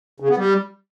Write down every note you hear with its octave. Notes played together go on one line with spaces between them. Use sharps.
C#3
B3
G3